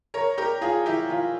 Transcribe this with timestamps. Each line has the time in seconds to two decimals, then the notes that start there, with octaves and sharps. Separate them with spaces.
0.14 A#4 C#5
0.38 G4 A#4
0.61 F4 G#4
0.86 E4 G4
1.10 F4